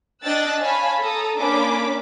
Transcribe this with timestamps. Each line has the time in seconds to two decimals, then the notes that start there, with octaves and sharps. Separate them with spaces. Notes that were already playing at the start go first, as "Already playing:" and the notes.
0.22 D4 D#5 G5 E6 F#6 A6
0.60 C#5 F5 G#5 A5 B5
1.02 A4 A#5 D#6
1.38 A#3 C#4 D4 B5 D6